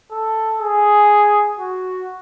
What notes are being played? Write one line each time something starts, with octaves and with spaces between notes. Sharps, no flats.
A4
G#4
F#4